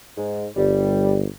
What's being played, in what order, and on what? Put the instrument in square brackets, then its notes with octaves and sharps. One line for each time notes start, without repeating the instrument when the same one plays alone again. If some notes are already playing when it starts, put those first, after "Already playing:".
[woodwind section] G#2
[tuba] G1 [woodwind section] G3